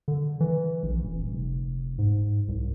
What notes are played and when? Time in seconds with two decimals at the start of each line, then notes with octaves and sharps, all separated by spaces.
0.08 D3
0.40 E3
0.83 A#1
1.03 D#1
1.32 F1
1.98 G#2
2.48 C2